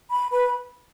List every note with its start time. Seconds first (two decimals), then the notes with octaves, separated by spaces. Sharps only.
0.10 B5
0.31 B4 B5